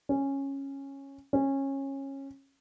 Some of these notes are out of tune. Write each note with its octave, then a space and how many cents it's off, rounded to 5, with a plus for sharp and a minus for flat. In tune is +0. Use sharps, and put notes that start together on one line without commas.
C#4 -10
C#4 -20